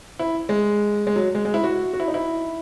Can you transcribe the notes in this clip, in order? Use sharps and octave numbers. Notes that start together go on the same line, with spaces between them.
E4
G#3
G#3
F#3
G#3
G#3
E4
F#4
F#4
E4
D#4
E4